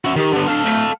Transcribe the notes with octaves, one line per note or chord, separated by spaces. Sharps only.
C#4 F#4 E5
D#3 G4
D3 B3
D4 A4 F5
A3